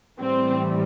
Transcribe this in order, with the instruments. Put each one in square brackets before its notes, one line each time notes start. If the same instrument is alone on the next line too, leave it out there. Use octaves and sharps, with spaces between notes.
[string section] A2 E3 G3 C4